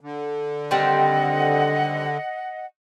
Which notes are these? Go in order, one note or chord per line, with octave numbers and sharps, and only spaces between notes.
D3
D#3 G3 C4 D#5 F#5